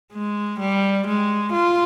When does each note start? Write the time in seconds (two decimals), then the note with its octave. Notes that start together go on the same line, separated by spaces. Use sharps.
0.13 G#3
0.60 G3
1.07 G#3
1.53 F4